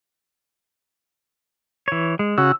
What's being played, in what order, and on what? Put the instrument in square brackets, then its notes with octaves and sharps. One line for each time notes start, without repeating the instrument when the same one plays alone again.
[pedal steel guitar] E3 C#5
G#3
[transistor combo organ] C#3 F#4 [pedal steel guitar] E6